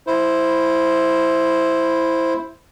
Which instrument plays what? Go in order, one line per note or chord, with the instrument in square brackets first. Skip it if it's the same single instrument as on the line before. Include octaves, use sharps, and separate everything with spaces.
[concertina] E4 C5